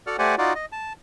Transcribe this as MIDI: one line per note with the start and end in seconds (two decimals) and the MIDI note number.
0.07 0.17 66
0.07 0.17 69
0.07 0.17 74
0.07 0.17 78
0.07 0.17 89
0.19 0.35 57
0.19 0.35 67
0.19 0.35 72
0.19 0.35 74
0.19 0.35 78
0.19 0.35 80
0.38 0.53 63
0.38 0.53 65
0.38 0.53 66
0.38 0.53 74
0.55 0.66 75
0.72 0.93 81